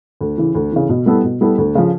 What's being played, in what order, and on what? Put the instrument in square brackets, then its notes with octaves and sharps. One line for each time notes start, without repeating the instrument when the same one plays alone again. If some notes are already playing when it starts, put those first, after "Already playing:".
[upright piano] D2
C#3 E3
D2
C#3 E3
B2
G3 B3 E4 A4
B2
G3 B3 E4 A4
D2
C#3 F3